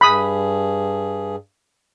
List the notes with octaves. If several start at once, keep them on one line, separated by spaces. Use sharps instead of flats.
G2 G#4 B5 D#6